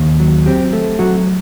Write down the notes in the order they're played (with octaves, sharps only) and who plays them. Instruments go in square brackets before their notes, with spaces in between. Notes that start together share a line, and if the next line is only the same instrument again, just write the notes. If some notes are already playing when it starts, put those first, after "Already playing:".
Already playing: [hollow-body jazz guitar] D#2
F#3
C4 G4
A3
F#3 F#4